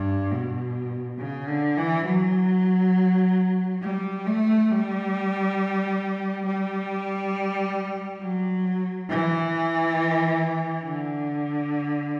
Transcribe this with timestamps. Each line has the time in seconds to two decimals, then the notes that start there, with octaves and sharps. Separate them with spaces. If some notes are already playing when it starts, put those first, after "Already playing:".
Already playing: G2
0.31 B2
1.18 C#3
1.48 D3
1.78 E3
2.07 F#3
3.82 G3
4.26 A3
4.71 G3
6.46 G3
8.21 F#3
9.09 E3
10.84 D3